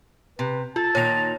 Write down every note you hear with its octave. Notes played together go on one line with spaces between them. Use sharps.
C3 B4
F4 A4 A5
A#2 D#3 C#5 A#6 F7